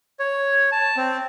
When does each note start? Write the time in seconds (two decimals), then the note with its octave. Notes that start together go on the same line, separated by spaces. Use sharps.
0.19 C#5
0.72 A5
0.97 C4